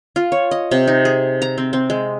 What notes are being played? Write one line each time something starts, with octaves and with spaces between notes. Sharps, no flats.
F4
C#5
D#5
C3
D#4
G#4
A#5
C4
C4
G#3